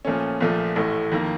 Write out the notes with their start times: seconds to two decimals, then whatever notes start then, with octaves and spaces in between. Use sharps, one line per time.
0.05 A#2 F3 A3 C#4
0.40 A#1 A#2 F3 A3
0.76 A1 A2 A3
1.12 F2 D#3 A#3